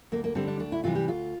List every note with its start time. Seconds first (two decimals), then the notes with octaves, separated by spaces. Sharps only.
0.12 D2 A#3
0.24 A#3
0.35 D3 G3 C4
0.47 D4
0.59 D2 D4
0.72 E4
0.84 C3 E3 G3 F4
0.95 G4
1.08 D2 F4